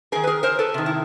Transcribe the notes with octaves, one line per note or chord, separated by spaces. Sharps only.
C3 D#3 G#4 A#4
B4
G#4 A#4
A#4 C5
A4 B4
C3 D#3
E4